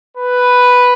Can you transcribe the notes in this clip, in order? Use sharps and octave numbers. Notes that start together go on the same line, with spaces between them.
B4